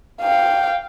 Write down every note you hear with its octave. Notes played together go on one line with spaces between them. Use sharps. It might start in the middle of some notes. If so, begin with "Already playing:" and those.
F5 G5